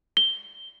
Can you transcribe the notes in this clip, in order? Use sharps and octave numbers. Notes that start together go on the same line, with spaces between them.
G7